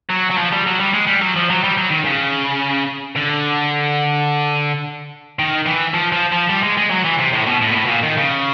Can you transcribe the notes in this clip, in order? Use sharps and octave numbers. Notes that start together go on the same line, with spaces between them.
F#3
F#3
F3
G3
F#3
G3
G#3
G3
F#3
F3
F#3
G3
F#3
D#3
C#3
D3
D#3
E3
F3
F3
F3
G3
G#3
G#3
F#3
E3
C3
A2
B2
A2
A#2
A2
B2
A#2
D#3
C#3